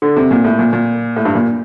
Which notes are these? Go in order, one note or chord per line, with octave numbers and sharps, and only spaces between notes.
D3
C3
A#2
A2
A#2
A#2
A2
G2
A#2